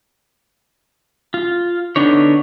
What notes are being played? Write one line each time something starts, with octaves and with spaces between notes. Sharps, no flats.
F4
D3 B3 D4 D#4 C#5